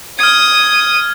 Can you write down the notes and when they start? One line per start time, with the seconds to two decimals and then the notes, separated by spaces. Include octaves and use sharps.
0.19 D#6 F6 G#6